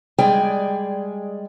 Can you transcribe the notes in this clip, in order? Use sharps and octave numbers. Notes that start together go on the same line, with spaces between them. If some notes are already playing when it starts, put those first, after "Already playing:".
G3 G#3 G#4 D5 G5